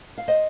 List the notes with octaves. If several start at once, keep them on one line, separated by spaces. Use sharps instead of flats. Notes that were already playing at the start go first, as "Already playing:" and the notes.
F5
C5 D#5